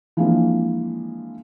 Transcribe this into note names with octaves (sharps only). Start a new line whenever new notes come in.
E3 F3 G#3 A#3 C4 D4